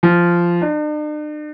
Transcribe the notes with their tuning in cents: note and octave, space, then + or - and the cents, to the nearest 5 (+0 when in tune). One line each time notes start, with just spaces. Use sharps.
F3 -10
D4 +45